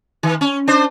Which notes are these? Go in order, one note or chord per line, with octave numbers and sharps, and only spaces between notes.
D#3
C#4
D4 C5